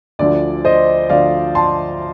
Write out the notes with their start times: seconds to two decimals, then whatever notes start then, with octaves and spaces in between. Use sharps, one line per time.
0.19 D2 D3 F3 D5
0.65 C5 D#5
1.10 D2 D3 F3 D5 F5
1.55 A5 C6